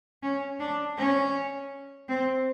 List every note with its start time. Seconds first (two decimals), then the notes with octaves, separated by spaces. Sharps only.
0.23 C#4
0.60 D4
0.97 C#4
2.09 C4